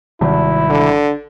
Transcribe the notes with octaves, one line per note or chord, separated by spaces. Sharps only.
G#1 C3 G3 E4
D3